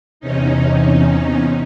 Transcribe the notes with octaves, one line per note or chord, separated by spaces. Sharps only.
E2 C3 C#4 D#4